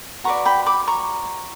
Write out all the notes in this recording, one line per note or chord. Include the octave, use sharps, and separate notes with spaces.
F#4 B4 D5 A#5 C#6
G5 B5
B5 D6
A#5 C#6